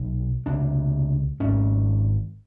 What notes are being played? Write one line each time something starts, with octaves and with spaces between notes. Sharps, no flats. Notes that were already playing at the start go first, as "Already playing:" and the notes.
Already playing: B1 A#2
C#2 C3 D4
G#1 G#2 C#4